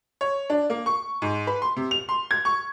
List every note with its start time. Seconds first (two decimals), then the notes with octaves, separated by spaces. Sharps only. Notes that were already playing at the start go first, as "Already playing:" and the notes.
0.21 C#5
0.50 D4
0.70 A#3
0.86 C#6
1.22 G#2
1.47 B4
1.62 C6
1.77 C3
1.91 F7
2.09 C6
2.31 G#6
2.45 C#6